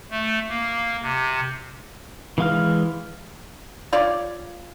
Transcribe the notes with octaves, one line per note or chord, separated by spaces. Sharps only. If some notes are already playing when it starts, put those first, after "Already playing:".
A3
A#3
C3
E3 G#3 F5 F6
F4 C#5 D5